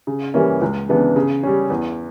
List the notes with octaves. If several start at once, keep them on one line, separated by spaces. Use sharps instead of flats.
C#3
E3 G3 A#3 C#4
C#2
C#3 E3 B3 D4
C#3
G3 C#4
E2